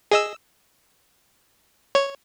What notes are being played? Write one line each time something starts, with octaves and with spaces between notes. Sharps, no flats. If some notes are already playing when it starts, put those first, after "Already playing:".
G#4 D#5 E6
C#5